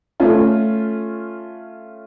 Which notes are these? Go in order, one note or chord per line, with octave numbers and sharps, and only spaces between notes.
A3 C#4 F4